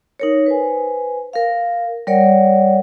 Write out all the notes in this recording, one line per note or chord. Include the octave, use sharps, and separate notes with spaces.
D#4 A#4 C#5
B4 C5 G#5
A#4 F5
G3 A#4 C#5 D5 F#5